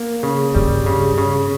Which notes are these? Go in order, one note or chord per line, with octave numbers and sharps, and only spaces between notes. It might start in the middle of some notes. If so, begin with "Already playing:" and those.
Already playing: A#3
C#3
G2 G3
C#3
C#3